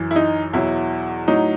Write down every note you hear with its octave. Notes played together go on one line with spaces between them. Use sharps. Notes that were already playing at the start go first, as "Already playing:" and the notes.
Already playing: F#2 E3
E4
D#4
E2 B2 F#3 E4
A2 F#3 D#4